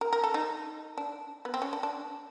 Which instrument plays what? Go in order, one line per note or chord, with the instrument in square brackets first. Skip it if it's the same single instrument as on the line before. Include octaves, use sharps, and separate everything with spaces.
[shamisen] A#4
A#4
A4
D#4
D4
B3
C4
C#4
D4
D4